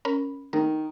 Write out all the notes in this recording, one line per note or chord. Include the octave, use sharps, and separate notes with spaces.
C#4 A#4 B5
D#3 A#4